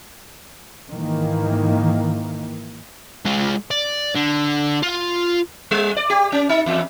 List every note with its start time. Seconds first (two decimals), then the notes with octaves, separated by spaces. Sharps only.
0.91 G#2 D#3 E3 A#3
3.25 G#3 F4
3.71 D5
4.15 D3
4.83 F4
5.71 G3
5.97 D5
6.10 G4
6.32 C#4
6.49 D#4
6.66 E2